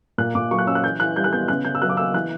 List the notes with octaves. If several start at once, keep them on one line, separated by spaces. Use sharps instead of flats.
A#2 F#6
A#2 D6
F#3 C#6
F#6
C#4 E6
F#6
E3 G6
E3 F#6
G3 G6
F#6
B3 G6
C#3 F#6
C#3 G6
E6
F#3 F#6
D6
A#3 E6
E3 F#6